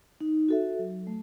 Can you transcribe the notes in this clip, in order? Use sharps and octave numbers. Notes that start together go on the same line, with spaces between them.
D#4
F#4 A4 E5
F#3
A3